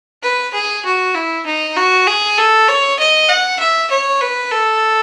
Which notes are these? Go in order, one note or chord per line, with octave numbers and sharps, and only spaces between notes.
B4
G#4
F#4
E4
D#4
F#4
G#4
A4
C#5
D#5
F#5
E5
C#5
B4
A4